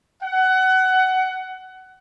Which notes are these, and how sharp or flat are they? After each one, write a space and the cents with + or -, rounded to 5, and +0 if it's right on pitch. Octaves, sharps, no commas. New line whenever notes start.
F#5 +20